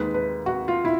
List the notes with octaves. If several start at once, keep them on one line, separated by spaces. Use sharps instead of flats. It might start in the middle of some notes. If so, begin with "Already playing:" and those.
Already playing: D#2 D#3 G#3 B4
B4
F#4
F4
E4